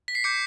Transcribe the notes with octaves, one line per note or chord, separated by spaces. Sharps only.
B6
C7
D6 G6 C#7